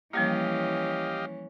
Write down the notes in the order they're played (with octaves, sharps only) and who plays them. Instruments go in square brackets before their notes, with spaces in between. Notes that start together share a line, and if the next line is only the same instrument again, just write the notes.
[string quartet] E3 C#4 [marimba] F3 G3 A#3 [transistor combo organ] G4 D#5 F5